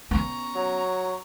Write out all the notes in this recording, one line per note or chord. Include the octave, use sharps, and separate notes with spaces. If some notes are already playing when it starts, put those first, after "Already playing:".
B3 C#4 A#5 C#6
F#3